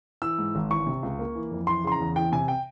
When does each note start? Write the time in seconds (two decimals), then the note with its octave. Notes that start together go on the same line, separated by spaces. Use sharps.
0.22 E3 E6
0.39 G#2
0.55 G#1
0.71 E3 C#6
0.86 C3
1.03 C#2
1.19 A#3
1.35 E3
1.51 F2
1.67 E3 C6
1.84 C#3 C6
1.92 A#5
2.00 E2
2.16 E3 G5
2.32 C3 G#5
2.48 G5